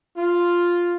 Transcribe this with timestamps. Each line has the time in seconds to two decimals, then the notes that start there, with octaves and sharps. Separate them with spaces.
0.17 F4